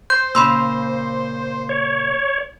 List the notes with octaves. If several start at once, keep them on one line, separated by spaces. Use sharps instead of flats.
C5 G6
A#2 C#3 A#3 B5 C6 E6
C#5